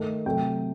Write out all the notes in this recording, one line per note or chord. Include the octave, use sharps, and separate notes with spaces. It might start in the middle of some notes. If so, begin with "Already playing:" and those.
Already playing: D#3 A3
C3 F#3 A3 G5